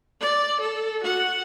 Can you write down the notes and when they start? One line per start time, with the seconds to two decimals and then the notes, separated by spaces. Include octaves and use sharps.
0.21 D5
0.60 A4
1.03 F#4 F#5